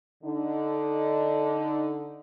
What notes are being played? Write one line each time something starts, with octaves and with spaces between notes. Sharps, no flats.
D3 D#4